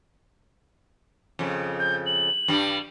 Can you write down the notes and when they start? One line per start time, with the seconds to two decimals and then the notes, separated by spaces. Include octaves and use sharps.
1.39 F2 C#3
1.79 G6
2.06 F#7
2.48 G2 G3